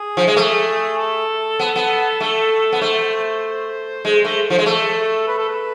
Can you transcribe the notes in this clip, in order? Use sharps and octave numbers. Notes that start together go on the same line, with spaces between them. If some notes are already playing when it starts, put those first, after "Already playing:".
Already playing: G#4
F3
G#3
A3
A4
B3
B3
A3
B3
A3 C5
G#3
A3
F3
G#3
A3 A4
B4
A4
B4